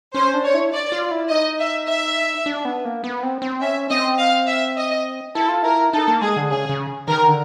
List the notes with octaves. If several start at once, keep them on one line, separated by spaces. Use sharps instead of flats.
C#4 C5
D4
C#5
E4
D5
F4
E4
D#4 D#5
E5
E5
D4
B3
A#3
B3
C4
C4
C#4 E5
C4 D#5
F5
E5
D#5
E4 A4
F4
E4 A#4
D#4 A4
A#3
G#3 G#4
D3
C#3 G#4
C#3
D#3 A#4
D3